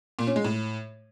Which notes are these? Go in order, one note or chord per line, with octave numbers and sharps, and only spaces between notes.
A#2
C#4
G#3
A2